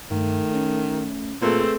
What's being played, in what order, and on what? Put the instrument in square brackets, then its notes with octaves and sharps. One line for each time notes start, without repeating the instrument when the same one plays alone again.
[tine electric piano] G2 [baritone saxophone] D#3 [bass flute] A3
[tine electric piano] C#4
[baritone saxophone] A#2 [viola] A3 C4 [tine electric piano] G#4 A4 B4